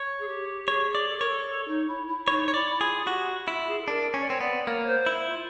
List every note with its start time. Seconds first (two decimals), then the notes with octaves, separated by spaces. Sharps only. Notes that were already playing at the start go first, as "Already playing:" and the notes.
Already playing: C#5
0.19 G#4
0.28 G4
0.68 G#4 C#5
0.95 D5
1.08 A4
1.18 A#4 C#5
1.28 A4
1.47 A4
1.68 D#4
1.88 E4
2.08 E4
2.28 D#4 C#5
2.48 C#5
2.54 E4 D5
2.81 F4 G#4
3.07 F#4 G4
3.47 E4 F4
3.68 G#4
3.81 A4
3.87 D4 A#4
4.14 C#4 C#5
4.21 D5
4.28 C4 C#5
4.41 B3 D5
4.67 A#3 C#5
4.87 C5
5.06 E4
5.27 F4